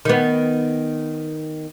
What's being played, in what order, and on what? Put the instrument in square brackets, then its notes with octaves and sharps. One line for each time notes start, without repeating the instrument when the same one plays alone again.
[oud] D#3 B3